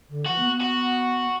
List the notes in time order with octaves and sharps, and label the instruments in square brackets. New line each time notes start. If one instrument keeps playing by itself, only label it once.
[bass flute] D3
[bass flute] E3 [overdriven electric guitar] F#4
[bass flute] B3
B3
[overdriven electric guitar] F#4